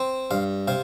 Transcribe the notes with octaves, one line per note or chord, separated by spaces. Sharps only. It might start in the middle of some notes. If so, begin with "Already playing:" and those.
Already playing: C4
G2 F5
C3 F5